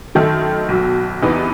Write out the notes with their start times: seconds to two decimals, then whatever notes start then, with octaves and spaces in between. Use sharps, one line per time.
0.15 F#2 D#3 A3
0.68 B1 B2 F#3
1.22 E2 C3 E3 B3 D#4